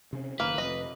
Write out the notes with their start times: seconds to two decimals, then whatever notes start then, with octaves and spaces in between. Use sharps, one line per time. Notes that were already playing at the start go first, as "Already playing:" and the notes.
0.13 C3 C#4
0.40 F#1 D#3 A#3 B4
0.58 F1 D#5